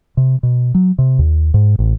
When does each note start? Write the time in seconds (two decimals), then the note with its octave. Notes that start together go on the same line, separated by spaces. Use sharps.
0.17 C3
0.43 B2
0.74 F#3
0.98 C3
1.19 D#2
1.54 G#2
1.79 A1